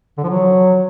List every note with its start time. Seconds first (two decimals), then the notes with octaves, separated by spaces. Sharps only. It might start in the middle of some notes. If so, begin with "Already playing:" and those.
0.18 D3
0.23 F3
0.29 F#3